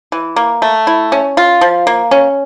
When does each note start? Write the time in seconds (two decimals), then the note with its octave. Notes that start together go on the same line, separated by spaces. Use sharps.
0.12 E3
0.36 A#3
0.62 A3
0.87 E4
1.12 C#4
1.37 F4
1.61 F3
1.87 A#3
2.11 C#4